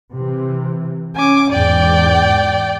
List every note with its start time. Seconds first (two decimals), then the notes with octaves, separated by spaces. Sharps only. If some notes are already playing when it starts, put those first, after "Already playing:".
0.13 C3 E3
1.16 C#4 G#5 D6
1.50 E2 G#2 D5 G5